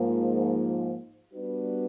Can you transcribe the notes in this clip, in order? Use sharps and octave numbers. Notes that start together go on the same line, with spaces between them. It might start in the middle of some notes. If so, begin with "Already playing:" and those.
Already playing: G#2 F3 A#3
G3 B3 D4 F#4 B4